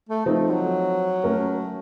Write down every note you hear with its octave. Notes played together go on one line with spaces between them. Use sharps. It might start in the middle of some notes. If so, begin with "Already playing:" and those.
A3
F3 A3 C4 D#4
F#3
A3 C#4 F#4 A#4